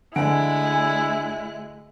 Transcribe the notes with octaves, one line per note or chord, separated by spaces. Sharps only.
D2 D3 G#3 E4 F#5 G#5 F#6 D7